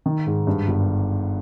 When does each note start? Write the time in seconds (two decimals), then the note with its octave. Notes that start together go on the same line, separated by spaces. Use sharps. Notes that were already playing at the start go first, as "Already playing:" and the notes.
0.06 D#3
0.27 G#2
0.47 G2
0.68 G1